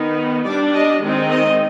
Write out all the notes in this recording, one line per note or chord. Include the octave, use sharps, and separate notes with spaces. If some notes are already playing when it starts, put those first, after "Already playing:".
Already playing: D#3 B3 D#4
G3 D4 D5
D#5
D#3 G#3 C4 D#4
D#5